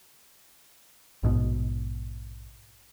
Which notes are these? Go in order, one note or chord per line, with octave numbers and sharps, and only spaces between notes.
A#1 G#2 B2